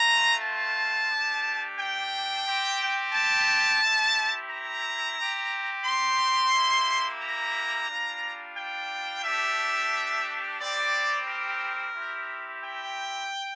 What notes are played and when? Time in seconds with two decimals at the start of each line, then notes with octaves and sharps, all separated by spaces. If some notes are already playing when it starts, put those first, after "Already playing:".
Already playing: A3 C4 F4 A#5
0.42 A5
1.10 A3 D4 G4
1.78 G5
2.46 C4 G4
3.13 A5
3.81 C4 E4 G4
4.49 A#5
5.16 C4 G4
5.84 C6
6.52 A#3 E4 G4
7.20 A#5
7.88 G3 D4 F4
8.56 G5
9.23 A3 D4 G4 E5
10.59 G3 C4 G4 D5
11.27 A#4
11.94 C4 E4 G4
12.63 G5